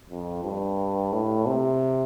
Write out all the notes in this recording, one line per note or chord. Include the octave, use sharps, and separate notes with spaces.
F2
G2
A2
C3